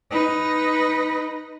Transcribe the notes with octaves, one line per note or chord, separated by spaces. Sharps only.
D#4 B4